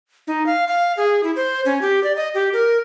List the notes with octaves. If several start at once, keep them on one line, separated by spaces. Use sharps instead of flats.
D#4
F5
F5
G#4
E4
C5
C#4
G4
D5
D#5
G4
A#4